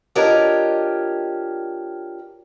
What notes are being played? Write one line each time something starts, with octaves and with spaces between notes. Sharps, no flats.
D4 F4 G4 A#4 C#5 D#5